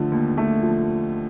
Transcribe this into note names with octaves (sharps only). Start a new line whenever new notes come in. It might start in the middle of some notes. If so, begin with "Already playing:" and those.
Already playing: D3 F3 A3
D#2
A3
F3